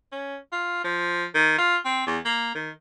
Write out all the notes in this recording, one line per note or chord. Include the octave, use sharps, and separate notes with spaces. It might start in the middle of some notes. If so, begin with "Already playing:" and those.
C#4
F4
F3
D#3
F4
C4
E2
A#3
D#3